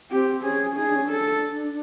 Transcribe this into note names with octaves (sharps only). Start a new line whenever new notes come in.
C4 G4
C#4 G#4
D#4 G#4
D4
C#4
D4 A4